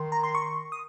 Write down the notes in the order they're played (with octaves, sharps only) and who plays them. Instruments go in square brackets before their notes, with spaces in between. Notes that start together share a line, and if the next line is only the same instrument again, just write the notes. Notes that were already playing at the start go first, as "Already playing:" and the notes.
Already playing: [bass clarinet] D#3 [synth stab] C6
[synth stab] A#5
C6
C#6
D#6